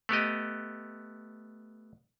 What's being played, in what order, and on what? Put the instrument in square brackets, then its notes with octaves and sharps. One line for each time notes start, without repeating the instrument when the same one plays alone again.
[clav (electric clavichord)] A3 B3 G4 D#5